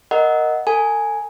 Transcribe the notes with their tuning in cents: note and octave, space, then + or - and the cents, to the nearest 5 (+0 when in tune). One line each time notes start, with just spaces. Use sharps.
A#4 +0 D#5 +0 F#5 +0
A4 +40 G#5 +0